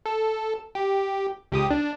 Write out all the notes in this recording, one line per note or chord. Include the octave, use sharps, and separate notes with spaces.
A4
G4
C#2 G4 D#6
D4